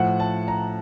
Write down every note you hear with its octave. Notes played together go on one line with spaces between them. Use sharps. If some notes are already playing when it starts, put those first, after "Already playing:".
Already playing: A2 F3 F#5
A5
A#5